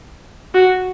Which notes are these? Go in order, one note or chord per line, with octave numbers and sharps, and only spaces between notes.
F#4